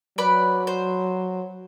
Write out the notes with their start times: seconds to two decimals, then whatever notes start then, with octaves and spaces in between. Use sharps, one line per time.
0.18 F#3 B4 D5 B5
0.67 C5